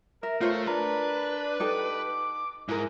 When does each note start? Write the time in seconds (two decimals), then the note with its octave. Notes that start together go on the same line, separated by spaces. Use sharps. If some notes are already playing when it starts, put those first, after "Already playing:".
0.23 A#4 E5
0.41 A3 F4 C5 C#5
0.67 D4 A#4 B4
1.60 D#4 G4 A4 D6
2.69 G#2 E4 A#4